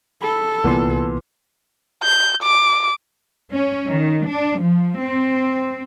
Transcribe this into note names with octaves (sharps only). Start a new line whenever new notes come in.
A4 B5
C2 A#2 E3 B3 C6
G6
D6
C#4
D#3
D4
F3
C4